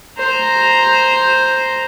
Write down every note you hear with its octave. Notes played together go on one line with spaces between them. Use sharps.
C5 A#5